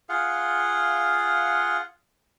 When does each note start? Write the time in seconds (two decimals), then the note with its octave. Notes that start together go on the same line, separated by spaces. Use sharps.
0.09 F4 G#4 F5 F#5